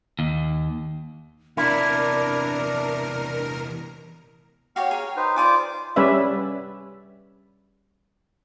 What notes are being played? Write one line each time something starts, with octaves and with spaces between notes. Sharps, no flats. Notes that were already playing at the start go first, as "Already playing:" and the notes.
D#2
E2 C3 D4 E4 A#4
F#4 G4 C#5 F5 F6
G#4 A#4 C#5
D#4 B4 C5
F4 C5 D5 G#5 D6 D#6
G3 C#4 B4 D5 E5